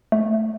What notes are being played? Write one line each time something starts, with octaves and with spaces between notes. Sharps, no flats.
A3